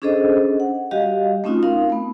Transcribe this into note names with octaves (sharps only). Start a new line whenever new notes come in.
C#4 D4 G#4 A4 C5 D#5
F#5
G3 F#4 G4 D#5 F5
A3 C4 C#4 D#4 F4 F#4
C4 D#4 A#4 F5
A3 B3